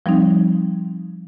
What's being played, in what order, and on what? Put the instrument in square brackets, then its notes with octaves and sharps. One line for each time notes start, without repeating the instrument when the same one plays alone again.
[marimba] F3 G3 C4 D#4